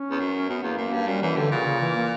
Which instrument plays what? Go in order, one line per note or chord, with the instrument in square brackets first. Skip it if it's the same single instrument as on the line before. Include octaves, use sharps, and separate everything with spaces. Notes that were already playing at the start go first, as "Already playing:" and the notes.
Already playing: [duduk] C#4
[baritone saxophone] E2
F#2
[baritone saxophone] F#2 [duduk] B3
[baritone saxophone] E2 [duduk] A#3
[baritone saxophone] F#2 [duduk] A#3
[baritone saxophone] G2
[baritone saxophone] F#2 [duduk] G3
[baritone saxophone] F#2 [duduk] E3
[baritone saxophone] G2 [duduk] D3
[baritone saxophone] A#2 [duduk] C#3
[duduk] C#3
E3
A#3